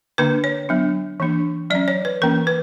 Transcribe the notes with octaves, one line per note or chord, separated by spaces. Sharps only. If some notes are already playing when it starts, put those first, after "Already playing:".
D3 A#3 D4 B4
C#5
F#3 B3 D4
E3 A#3 D4
F#3 C#4 D5
C#5
B4
E3 A#3 C#4 A#4
B4